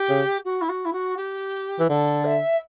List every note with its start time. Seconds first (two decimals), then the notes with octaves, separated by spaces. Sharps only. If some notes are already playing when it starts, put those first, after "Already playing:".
Already playing: G4
0.09 C#3
0.45 F#4
0.61 E4
0.69 F#4
0.85 E4
0.93 F#4
1.17 G4
1.79 E3
1.89 D3 A4
2.25 E5